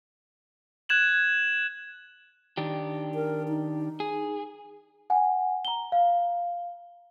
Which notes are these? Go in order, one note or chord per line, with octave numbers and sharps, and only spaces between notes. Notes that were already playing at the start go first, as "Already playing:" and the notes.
F#6 G#6 E7 F#7
D#3 D4 G4
A#4
D#4
G#4
F#5 G#5
A#5 G7
F5